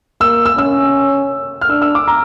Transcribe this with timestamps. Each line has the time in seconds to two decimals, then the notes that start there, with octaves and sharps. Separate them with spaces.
0.21 A#3 E6
0.46 E6
0.58 C#4 E6
1.61 F6
1.70 D4 E6
1.82 E6
1.95 D6
2.08 A#5